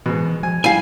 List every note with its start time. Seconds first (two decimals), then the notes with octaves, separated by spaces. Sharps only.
0.06 G#2 B2 E3
0.43 F3 G#5
0.64 G3 E4 F5 G#5